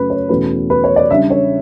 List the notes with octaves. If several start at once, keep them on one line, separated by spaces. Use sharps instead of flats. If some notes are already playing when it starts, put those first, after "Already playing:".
Already playing: F#2 C#3 F#3 A3 C#4 B4
C#5
E2 B2 A3 C#4 B4
B4
C#5
D5
C#3 G3 D4 E5
C#5